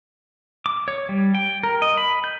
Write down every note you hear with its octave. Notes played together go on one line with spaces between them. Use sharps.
D6
C#5
G3
G5
A#4
D#5
B5
G6